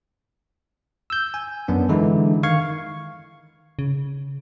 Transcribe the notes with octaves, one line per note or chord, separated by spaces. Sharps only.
E6 G6
G#5
F#2 B3 D4
D3 E3 G#3 D#4 E4
D#3 F5 C#6 G#6
C#3